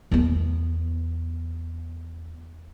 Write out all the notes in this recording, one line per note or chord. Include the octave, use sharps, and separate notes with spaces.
E2 B3